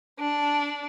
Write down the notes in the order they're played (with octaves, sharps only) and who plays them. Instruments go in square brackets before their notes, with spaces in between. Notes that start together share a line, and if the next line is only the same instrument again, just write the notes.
[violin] D4